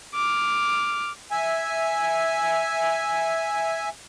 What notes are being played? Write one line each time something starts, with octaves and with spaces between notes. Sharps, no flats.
D6 F6
E5 G#5